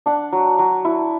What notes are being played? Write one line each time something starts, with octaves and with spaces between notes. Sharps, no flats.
D4 F#5
F#3
F#3
E4